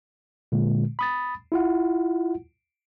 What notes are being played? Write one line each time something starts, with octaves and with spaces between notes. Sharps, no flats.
A#2 D3 G#3
B5 D#6 A6
E4 F4 F#5